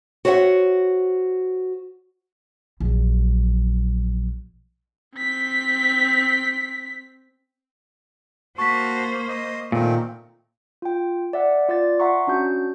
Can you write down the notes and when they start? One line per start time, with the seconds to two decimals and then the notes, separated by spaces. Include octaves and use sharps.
0.25 F#4 C5 C#5 E5 F#5
2.80 A#1 F#3
5.16 C4 B6
8.58 A#3 F#4 C5 A5 C#6 B6
9.29 D#5
9.72 A#2 D#3 A3 C4
10.82 F4 G5
11.33 D5 E5 F#5
11.69 F4 D5 A6
12.00 E5 F#5 A#5 C6 C#6
12.27 C#4 D4 F#4 G6